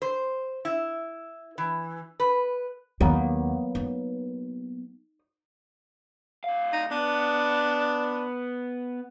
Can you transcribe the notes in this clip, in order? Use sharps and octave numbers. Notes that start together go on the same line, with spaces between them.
C5
E4
E3
B4
D#2 F#3 A#3 B3
D#4
A2 F5
D#4
B3 D4